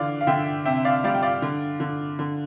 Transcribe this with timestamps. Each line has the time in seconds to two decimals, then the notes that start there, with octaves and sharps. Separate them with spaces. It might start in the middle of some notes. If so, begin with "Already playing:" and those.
Already playing: D3 E3 D5 F5
0.21 F5
0.27 D3 E5 G5
0.65 C3 E5 G5
0.85 D5 F5
1.04 G3 D5 F5
1.14 G5
1.23 D5 F5
1.42 D3
1.80 D3
2.19 D3